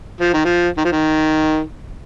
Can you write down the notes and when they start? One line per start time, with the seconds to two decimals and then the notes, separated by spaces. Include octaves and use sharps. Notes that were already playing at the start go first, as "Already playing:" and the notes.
0.21 F3
0.34 D#3
0.46 F3
0.78 D#3
0.85 F3
0.92 D#3